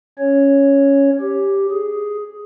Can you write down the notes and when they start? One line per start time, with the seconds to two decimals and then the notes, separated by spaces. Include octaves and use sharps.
0.19 C#4 C#5
1.21 G4
1.72 G#4